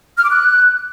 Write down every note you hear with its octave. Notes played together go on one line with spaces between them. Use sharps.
F6
D6
F#6